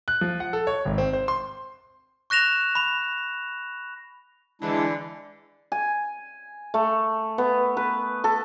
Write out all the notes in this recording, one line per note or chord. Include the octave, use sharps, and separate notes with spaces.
F#6
F3
F#5
A4
C#5
G#1
C4
C5
C6
C#6 F#6 A#6 E7 F7
B5 F7
D3 E3 G#3 D4 E4
G#5
A3
B3
B4
A4